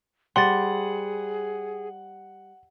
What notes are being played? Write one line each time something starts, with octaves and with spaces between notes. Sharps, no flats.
G3 G#4 C5 F#5 C6 A6